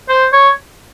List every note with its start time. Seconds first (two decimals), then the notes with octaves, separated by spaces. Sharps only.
0.09 C5
0.33 C#5